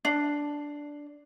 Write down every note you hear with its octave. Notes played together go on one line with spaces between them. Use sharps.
D4